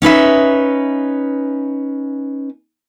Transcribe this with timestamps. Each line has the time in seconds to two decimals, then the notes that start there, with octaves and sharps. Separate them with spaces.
0.02 C#4 D#4 B4 E5